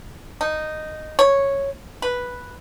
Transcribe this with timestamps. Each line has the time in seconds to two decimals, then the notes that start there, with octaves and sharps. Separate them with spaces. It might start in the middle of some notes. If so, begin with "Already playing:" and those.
0.41 D#4
1.19 C#5
2.02 B4